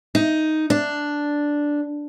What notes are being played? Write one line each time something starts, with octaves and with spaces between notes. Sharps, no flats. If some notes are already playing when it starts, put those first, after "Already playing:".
D#4
D4